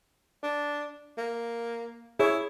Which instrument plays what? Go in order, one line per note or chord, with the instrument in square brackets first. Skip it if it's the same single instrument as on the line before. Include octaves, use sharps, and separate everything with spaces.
[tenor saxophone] D4
A#3
[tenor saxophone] E4 [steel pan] G#4 C#5